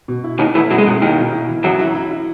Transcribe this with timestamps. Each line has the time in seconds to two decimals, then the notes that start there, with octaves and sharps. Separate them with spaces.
0.08 B2
0.24 E4
0.39 D#2 D#3 E4
0.55 E2 E3 A3
0.70 F#2 B2 F#3
0.78 G#3
0.86 F#2 B2 F#3
1.02 D#2 D#3 E4
1.17 B2
1.33 E4
1.48 E3
1.64 F#2 E3 F#3
1.79 E4
1.95 E4
2.11 E4